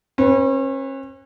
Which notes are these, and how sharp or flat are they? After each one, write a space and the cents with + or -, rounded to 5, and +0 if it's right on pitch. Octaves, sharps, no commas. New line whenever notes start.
C#4 -40 B4 +0